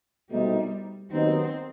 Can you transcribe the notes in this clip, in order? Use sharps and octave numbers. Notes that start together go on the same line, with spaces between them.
C2 B2 G3 A3 C4 D#4
D#2 D#3 F#3 B3 C4 D#4